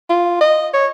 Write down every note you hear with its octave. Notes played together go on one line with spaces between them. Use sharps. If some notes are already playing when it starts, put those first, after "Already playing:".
F4
D#5
C#5